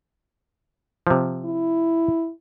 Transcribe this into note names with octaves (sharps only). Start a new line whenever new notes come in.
C3 F3
E4